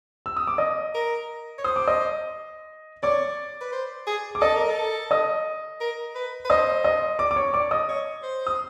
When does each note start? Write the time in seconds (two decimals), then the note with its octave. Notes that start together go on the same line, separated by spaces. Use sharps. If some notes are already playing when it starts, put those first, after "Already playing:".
0.26 E6
0.37 D#6
0.47 D6
0.58 D#5 D#6
0.95 A#4
1.58 C#5
1.64 C5 D#6
1.76 D6
1.87 D#5 D#6
3.03 C#5 D5 D6
3.61 B4
3.72 C5
4.07 G#4
4.35 D6
4.41 A4 D#5 D#6
4.56 A#4
4.70 A4
5.11 D#5 D#6
5.80 A#4
6.15 B4
6.45 B4
6.50 C5 D#5 D#6
6.84 D#5 D#6
7.19 D5 D6
7.31 D6
7.36 C#5 C#6
7.54 D5 D6
7.71 D#5 D#6
7.88 C#5
8.23 C5
8.47 D#6